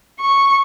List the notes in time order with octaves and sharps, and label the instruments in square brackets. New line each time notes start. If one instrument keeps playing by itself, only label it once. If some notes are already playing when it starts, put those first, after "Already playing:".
[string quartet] C#6